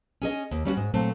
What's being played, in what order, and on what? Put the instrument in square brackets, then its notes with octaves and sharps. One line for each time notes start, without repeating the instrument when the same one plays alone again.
[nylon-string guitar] C#4 G#4 D#5
D#2
G3 C#4 F4 F#4
G#2
A#2 F#3 A3 C4